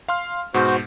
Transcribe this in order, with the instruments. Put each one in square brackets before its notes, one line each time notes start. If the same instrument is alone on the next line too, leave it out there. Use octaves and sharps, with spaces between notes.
[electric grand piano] F5 C6 F6
[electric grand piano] G#2 B2 [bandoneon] F#4 C5